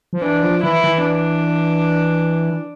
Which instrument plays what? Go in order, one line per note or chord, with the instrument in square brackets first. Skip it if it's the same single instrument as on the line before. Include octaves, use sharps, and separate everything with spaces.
[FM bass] F3
[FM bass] E3 [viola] D4
[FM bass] F3
[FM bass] E3 [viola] E4
[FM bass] E3
[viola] D4